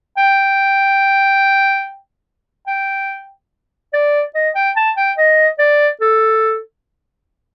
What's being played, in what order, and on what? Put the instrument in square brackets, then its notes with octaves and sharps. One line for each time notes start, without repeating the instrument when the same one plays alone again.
[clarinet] G5
G5
D5
D#5
G5
A5
G5
D#5
D5
A4